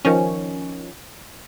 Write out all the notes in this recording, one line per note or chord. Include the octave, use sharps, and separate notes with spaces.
D#3 F3 C#4